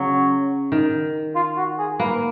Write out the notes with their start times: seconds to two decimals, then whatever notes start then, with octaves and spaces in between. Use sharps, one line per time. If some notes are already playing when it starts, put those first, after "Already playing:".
Already playing: C#3 F#3
0.72 D#3
1.35 F4
1.57 F#4
1.79 G#4
1.99 A#3 B4